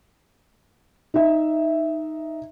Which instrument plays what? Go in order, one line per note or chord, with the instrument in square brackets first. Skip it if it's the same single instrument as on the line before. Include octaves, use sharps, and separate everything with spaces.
[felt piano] D#4 E5